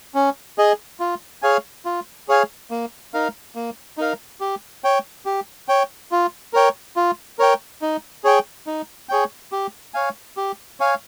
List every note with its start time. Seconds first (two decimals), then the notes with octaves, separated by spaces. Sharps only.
0.15 C#4
0.58 G#4 D#5
1.00 F4
1.42 G#4 C#5 F5 G#5
1.85 F4
2.28 G#4 C#5 F5 G#5
2.71 A#3
3.14 D#4 A#4 F5
3.55 A#3
3.98 D#4 A#4 F5
4.40 G4
4.84 C#5 G5
5.26 G4
5.68 C#5 G5
6.12 F4
6.53 A#4 C#5 G5
6.96 F4
7.39 A#4 C#5 G5
7.82 D#4
8.24 G#4 C#5 G5
8.67 D#4
9.09 G#4 C#5 G5
9.52 G4
9.94 C#5 F5 G#5
10.37 G4
10.80 C#5 F5 G#5